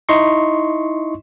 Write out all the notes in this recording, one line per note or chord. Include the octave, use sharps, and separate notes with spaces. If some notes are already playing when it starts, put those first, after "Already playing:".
D#4 E4 D#5 C6 C#6